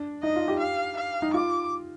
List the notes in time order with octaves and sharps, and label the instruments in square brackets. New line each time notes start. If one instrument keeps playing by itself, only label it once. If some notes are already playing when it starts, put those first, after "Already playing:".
Already playing: [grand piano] D4
[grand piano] D#4 [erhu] D#5
[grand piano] F4
G4
[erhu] F5
F5
[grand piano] D#4
[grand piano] F4 [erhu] D6